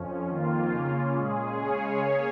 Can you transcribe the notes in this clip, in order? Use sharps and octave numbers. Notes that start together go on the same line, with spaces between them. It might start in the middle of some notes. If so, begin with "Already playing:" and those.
Already playing: F2 F3 C#4
F2 D#3 A#3 F4
C#3 A#3 C#4
A#2 G#3 C#4 G#4
C#3 G#3 C#4 G#4 C#5
A#3 C#4 G#4 C#5